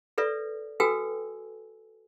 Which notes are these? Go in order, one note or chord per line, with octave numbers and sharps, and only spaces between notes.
A4 B4 D5 E5
F#4 A4 B4 G5 G#5 E6